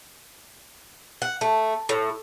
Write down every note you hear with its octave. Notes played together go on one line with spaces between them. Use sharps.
F#5
A3
A2